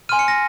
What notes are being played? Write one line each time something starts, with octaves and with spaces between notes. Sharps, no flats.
G#5 C6 F6 D#7
C#7
A#6